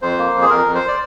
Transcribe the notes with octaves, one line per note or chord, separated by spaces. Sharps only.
F2 C5
A#3
F2
G#4
F2 A#4
F2
C5
D5